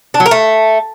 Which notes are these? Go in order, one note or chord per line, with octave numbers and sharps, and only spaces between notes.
D4
F#3
A#4
A3